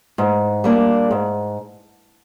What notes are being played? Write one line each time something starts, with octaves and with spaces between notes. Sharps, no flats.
G#2
G3 A#3 D4
G#2